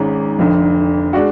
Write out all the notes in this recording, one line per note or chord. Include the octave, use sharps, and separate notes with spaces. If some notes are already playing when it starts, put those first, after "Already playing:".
Already playing: G#1 G#2 G#3 C#4
F1 F2 D3
G#3 D4 F#4